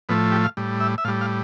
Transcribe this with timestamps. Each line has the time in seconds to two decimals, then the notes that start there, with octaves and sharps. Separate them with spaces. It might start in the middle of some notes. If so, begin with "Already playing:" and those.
0.09 A2 F3 A3 B3
0.32 G4
0.44 F5
0.57 A2 G3
0.80 E5
0.98 E5
1.04 A2 F5
1.08 G3
1.21 F5